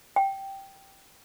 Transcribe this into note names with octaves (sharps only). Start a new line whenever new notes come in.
G5